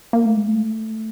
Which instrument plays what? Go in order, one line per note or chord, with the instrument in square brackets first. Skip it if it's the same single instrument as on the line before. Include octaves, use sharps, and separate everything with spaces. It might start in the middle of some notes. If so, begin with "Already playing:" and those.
[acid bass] A#3
A3
G#3
A3